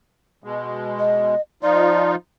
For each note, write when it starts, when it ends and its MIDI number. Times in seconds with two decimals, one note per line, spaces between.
0.44 1.35 47
0.44 1.35 56
0.99 1.41 75
1.63 2.15 53
1.63 2.15 63
1.63 2.15 65
1.63 2.11 74